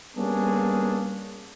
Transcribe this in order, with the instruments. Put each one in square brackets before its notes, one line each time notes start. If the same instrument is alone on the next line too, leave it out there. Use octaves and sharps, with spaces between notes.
[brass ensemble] G3 A#3 B3 C#4 D4 G#4